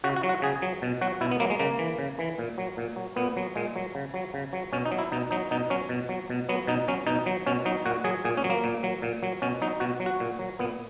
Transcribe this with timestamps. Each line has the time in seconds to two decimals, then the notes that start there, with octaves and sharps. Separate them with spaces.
0.04 C#3 F#4
0.16 F#4
0.23 F#3
0.29 F#4
0.42 C#3 G#4
0.62 F#3
0.82 B2
1.01 F#3 F#4
1.21 B2 E4
1.31 B3
1.40 F#3 A#3
1.50 G#3
1.59 C#3 A#3
1.79 E3
1.99 C#3
2.19 E3
2.39 A#2
2.58 F#3
2.77 A#2
2.96 F#3
3.16 A#2 B3
3.37 F#3
3.56 A#2 G#3
3.76 F#3
3.95 C#3
4.14 F#3
4.34 C#3
4.53 F#3
4.73 B2 C#4
4.85 D#4
4.92 F#3
4.99 E4
5.12 B2 D#4
5.31 F#3 D#4
5.51 B2 D#4
5.70 F#3 C#4
5.89 B2
6.09 F#3
6.30 B2
6.49 F#3 B3
6.67 B2 D#4
6.88 F#3 C#4
7.07 B2 D#4
7.26 F#3
7.47 B2 C#4
7.65 F#3 D#4
7.85 A#2 F#4
8.04 F#3 G#4
8.25 A#2 G#4
8.37 C#4
8.44 F#3
8.50 A#3
8.64 A#2
8.83 F#3
9.02 A#2
9.23 F#3
9.42 B2 C#4
9.62 F#3 D#4
9.80 B2 F#4
10.00 F#3
10.06 F#4
10.20 A#2
10.39 F#3
10.59 A#2 B3